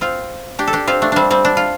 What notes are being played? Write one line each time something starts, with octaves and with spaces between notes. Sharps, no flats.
C4 F4
D4 G4
A4
D4 G4
C4 F4
A3 D4
G3 C4 D4
G3 C4
D4
F4